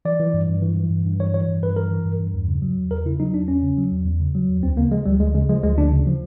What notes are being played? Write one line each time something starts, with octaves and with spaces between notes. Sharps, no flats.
E3 D5
E3
G2
G2
E3
E3
G2
G2
E3 C#5
E3 C#5
G2
G2 B4
E3 A#4
E3
G2
G2
E2
C#3
F#3
E2
E2 A#4
C#3 E4
F#3 D#4
E2 D4
E2 C#4
C#3
F#3
E2
E2
C#3
F#3
E2
D2 C4
C#3 A#3
F3 G#3
D2 G3
D2 G#3
C#3 G#3
F3 G#3
D2 G#3
D2 D4
C#3
F3